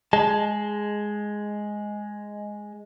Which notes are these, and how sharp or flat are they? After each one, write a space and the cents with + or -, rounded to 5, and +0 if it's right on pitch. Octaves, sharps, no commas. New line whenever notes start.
G#3 +0 A5 -15